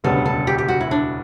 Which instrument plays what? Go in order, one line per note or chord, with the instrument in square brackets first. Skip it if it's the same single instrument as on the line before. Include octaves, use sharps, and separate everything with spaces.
[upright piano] E1 D2 C#3 G3 B3 [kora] A4
[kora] A4
G4
G4
F#4
E4
D4